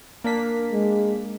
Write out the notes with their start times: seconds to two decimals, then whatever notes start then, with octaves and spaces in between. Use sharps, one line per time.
0.24 A#3 D4 B6
0.72 G#3